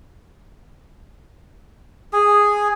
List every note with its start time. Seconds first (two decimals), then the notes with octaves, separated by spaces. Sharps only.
2.13 G#4